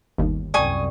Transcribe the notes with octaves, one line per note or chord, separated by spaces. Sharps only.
G1 D#2
C2 F#2 D5 G5 G#5 C#6 D#6